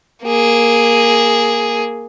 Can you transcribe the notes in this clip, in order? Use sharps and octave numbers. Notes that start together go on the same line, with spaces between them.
A#3 G#4